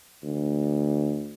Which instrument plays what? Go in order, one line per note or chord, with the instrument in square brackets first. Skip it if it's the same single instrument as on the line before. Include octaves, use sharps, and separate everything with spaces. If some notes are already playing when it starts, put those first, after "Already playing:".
[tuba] D2